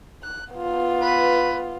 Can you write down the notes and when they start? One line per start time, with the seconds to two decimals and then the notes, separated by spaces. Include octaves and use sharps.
0.23 F#6
0.54 B3 F4
1.01 B4